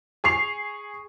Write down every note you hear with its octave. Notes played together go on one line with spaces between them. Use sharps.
G#4 C#6 C7 F7